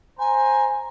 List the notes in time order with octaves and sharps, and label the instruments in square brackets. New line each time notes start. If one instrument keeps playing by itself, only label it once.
[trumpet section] C5 A#5 [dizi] G#5